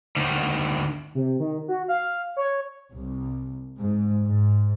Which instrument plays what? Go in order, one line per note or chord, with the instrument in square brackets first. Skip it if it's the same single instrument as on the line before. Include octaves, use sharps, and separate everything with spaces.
[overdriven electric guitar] D2 D#3
[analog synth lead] C3
D#3
F#4
F5
C#5
[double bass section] C2
G#2
G#2